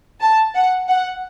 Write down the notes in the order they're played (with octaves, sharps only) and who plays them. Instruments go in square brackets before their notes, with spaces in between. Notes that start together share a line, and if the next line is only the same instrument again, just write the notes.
[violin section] A5
F#5
F#5